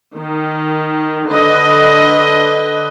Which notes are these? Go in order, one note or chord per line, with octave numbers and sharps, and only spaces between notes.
D#3
D3 B4 D#5